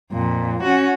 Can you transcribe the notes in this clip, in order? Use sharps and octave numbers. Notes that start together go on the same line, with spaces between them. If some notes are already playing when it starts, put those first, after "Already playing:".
F2 A#2
C#4 F#4